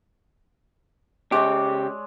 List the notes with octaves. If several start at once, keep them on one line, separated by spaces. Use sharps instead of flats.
C#3 G#3 G4 C#5 D5